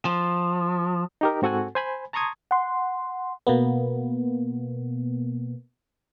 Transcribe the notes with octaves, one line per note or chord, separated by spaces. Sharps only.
F3
D#4 G4 A#4
G#2 C4 F#4 A4 F#5 G#5
C5 G#5 B5
A5 A#5 C6 C#6 D#6 G#6
F#5 C6
B2 A#3 B3